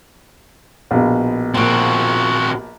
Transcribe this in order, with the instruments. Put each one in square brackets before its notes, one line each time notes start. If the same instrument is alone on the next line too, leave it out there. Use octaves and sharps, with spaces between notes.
[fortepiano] A#1 B2
[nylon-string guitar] A#2 F3 [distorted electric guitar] C4 F#4